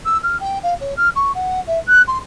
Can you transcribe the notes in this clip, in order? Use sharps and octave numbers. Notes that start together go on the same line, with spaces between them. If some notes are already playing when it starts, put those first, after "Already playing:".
E6
F6
G5
F5
C#5
F6
C#6
F#5
E5
F#6
C6